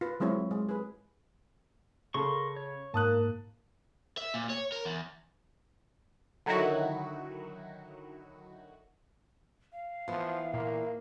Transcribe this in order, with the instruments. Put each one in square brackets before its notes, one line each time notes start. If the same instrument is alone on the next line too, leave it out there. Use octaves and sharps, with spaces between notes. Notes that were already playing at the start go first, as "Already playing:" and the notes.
[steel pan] F4 B4
F#3 G#3 C4 E4 C#5
G#3
G#4 B4
[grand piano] C#3 A4 [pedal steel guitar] A#4 C6 C#6
[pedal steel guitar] C#5
[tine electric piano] G#2 [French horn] A#3 [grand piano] A5 D#6 F#6
[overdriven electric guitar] E5
A#2
C#5
A#4
E2
[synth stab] D3 D#3 F#3 D#4 E4 F#4
[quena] F5
[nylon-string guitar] E3 B3 [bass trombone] F3
[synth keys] A#2 [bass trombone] A#3